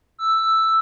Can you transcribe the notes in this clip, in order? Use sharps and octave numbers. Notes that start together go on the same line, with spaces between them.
E6